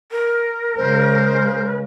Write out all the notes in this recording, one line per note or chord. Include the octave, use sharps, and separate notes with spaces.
A#4
C#3 G#3 C5